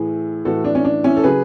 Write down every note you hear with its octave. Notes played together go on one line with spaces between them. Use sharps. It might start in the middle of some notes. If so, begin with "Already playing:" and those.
Already playing: A2 E3 E4 G#4
A2 E3 F#4 A4
D4
C#4
D4
C#4 E4
A4
C#3 F#3 G#4 B4